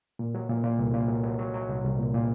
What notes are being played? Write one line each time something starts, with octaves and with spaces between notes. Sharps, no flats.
A#2
F#3
A#2
A#2
C2
A#2
F#3
F#3
F#3
F#3
C2
C2
A#2
A#2